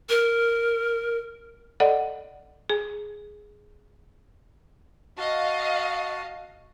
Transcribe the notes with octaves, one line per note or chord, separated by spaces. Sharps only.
A#4
A4 D5 D#5 F#5
G#4
F#4 D#5 F5 A5